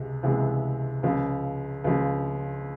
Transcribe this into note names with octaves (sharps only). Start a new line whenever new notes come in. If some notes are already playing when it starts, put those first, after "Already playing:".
Already playing: C#2 C3 G#3
C#2 C3 E3 G#3
C#2 C#3 F3
C#2 C#3 F3